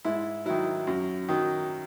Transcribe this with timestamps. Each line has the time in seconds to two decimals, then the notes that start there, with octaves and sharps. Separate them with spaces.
0.05 G#2 E4
0.46 D#3 F#3 E4
0.87 F#2
1.29 D#3 F#3